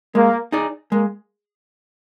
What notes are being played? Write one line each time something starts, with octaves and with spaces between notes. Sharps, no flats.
G#3 A#3
D#4 G#4 D5
G#3 A#3